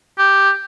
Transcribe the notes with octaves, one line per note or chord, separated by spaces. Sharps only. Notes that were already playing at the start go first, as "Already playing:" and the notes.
G4